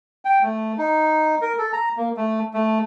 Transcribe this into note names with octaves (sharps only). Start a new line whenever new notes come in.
G5
A3
D#4
A#4
A4
A#5
A#3
A3
A3